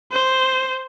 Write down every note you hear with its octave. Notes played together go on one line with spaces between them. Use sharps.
C5